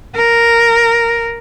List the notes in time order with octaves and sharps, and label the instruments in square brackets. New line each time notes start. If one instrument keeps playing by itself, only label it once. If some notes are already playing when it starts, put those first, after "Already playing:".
[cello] A#4